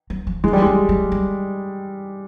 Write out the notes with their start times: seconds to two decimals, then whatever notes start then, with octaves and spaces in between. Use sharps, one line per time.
0.10 F#3
0.27 F3
0.44 E3 G#3
0.53 G3
0.62 F#3 G#3
0.89 F#3
1.12 G3